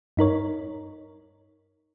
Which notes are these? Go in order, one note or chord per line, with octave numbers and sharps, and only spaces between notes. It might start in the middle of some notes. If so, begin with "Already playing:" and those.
G2 D#4 A#4 C#5